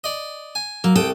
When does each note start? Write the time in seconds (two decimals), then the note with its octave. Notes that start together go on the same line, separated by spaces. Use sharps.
0.04 D5 D#5
0.55 G#5
0.84 F#3 A#3
0.96 C2 A4 G5 D#6